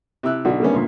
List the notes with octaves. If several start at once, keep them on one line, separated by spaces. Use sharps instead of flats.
C3 E4 E6 F#6
B1 D3 F#4 D5
D3 D#3 G3 A#3 B3 C#4
D2 A#2